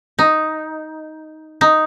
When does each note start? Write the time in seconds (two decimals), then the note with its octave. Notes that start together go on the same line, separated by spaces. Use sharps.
0.19 D#4
1.61 D#4